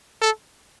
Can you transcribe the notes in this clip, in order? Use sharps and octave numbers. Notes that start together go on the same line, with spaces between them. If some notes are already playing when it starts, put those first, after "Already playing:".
A4